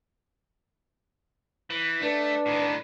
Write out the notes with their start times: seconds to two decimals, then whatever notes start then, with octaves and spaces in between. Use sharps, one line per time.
1.70 E3
2.02 A3 D4 B4
2.46 A2 D#3